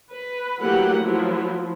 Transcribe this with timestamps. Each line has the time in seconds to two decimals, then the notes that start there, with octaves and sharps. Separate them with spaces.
0.11 B4
0.61 E3 F#3 A3 A#3 G4 F#5
1.02 F3 F#3 E4